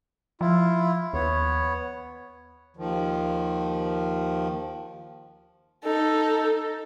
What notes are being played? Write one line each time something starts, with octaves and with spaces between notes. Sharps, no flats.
F3 E4 F4
D#2 B3 C#5
D#2 D#3 F3
D#4 A4